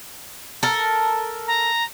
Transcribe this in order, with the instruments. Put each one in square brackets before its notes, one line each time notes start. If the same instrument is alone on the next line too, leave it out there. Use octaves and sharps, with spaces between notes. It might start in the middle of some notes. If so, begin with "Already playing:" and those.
[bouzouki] A4 A#4
[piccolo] A#5